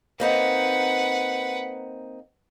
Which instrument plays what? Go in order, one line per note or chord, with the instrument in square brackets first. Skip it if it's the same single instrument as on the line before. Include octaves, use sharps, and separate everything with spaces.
[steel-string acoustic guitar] A#3 C4 D#4 [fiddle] B4 F#5